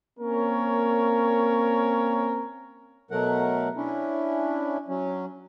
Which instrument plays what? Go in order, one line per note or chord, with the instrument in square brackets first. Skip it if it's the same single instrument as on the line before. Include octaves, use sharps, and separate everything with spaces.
[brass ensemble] A#3 C4 C#4 A#4 C#5
[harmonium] B2 F#3 A3 A#4 F#5
C#4 D4 E4
F#3 C#4